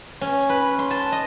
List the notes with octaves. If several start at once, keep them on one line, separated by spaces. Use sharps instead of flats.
C#4
B4
C6
A5
D#5